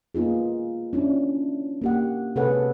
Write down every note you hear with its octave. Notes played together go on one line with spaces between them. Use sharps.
A#3 B3 D#4 F4 G#4
C#4 D4 E4
A#3 G4 F#5
C3 G#4 A4 B4 C#5 F#5